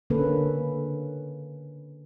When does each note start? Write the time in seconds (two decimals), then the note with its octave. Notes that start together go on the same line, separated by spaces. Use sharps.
0.10 D3 A#3 C#4 A4 B4